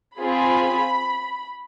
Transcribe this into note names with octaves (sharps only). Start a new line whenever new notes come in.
C4 F4 G#4 B5